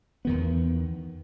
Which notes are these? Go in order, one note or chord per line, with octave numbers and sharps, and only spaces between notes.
E2 D#3 B3